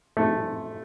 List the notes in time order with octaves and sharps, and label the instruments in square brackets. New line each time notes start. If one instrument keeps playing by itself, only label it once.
[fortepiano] A3